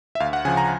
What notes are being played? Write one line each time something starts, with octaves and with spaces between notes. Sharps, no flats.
E5
D2 F5
F#5
C#3 F3 G#5
A#5